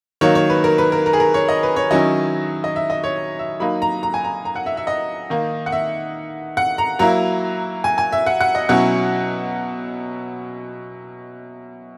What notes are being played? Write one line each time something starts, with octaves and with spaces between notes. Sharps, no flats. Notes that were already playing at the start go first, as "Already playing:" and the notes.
D#3 F#3 A#3 C#5
C#5
B4
A#4
B4
A#4
A#4
G#4
A#4
C#5
D#5
B4
C#5
D#3 F#3 C#4 E4 D#5
D#5
E5
D#5
C#5
E5
F#3 A#3 D#4 B5
A#5
A#5
G#5
A#5
A#5
F#5
E5
E5
D#5
D#3 A#3 D#4
F#5
E5
F#5
A#5
F#3 A#3 E4 A#5
G#5
G#5
E5
F#5
F#5
D#5
B2 F#3 C#4 E4 F#5